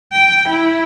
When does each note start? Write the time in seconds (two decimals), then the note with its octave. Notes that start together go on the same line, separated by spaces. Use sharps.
0.13 G5
0.49 E4